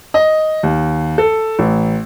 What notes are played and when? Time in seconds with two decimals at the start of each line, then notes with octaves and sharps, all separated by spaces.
0.14 D#5
0.63 D#2
1.18 A4
1.59 A1